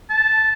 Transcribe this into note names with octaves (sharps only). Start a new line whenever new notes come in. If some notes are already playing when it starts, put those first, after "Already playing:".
A5